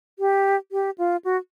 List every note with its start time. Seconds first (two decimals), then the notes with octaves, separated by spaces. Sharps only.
0.19 G4
0.72 G4
0.98 F4
1.25 F#4